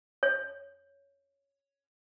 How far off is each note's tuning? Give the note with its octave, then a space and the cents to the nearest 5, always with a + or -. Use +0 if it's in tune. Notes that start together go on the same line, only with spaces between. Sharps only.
C#5 +5